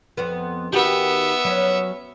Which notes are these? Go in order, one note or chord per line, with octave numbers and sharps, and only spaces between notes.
F2 B3
D#3 B3 F#4 G4 E5
F#3 C#4